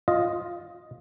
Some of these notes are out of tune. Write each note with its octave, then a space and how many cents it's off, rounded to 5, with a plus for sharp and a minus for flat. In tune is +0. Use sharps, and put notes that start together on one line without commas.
F4 +0 D#5 +0